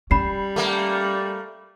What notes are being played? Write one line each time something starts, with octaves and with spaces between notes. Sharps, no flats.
G3 C#4 B5 C7
A3 A#3